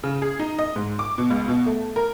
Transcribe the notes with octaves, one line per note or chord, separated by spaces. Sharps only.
C#3
G#4
D#4
D#5
G#2
D6
B2
C#2
B2
A3
A#4